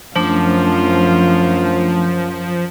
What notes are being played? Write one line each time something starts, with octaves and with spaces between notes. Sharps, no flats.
F#2 F3 A3 D4 F4